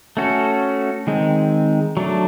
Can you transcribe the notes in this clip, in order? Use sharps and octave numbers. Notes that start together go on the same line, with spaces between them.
A3 C#4 F#4 A4
D#3 G#3 C4
F#3 A3 D4